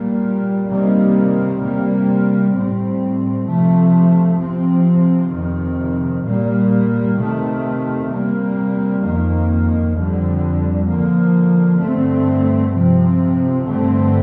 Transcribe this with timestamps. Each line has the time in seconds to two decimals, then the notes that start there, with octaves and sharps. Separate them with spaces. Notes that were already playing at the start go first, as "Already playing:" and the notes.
Already playing: A#2 G3 A#3
0.68 C3 D#3 G3 A#3
1.61 C3 G3 A#3
2.53 A2 G3 C4
3.46 C3 F3 A3
4.38 C3 F3 C4
5.31 F2 C3 D#3
6.23 A#2 G3 A#3
7.16 C3 D#3 A3
8.09 C3 G3 A#3
9.02 F2 D#3 A#3
9.94 F2 D3 G3
10.87 D3 F3 A#3
11.80 G2 D3 A3 C4
12.73 C3 F3 C4
13.66 G2 D3 A3 C4